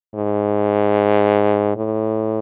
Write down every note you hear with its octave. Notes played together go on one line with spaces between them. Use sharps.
G#2
A2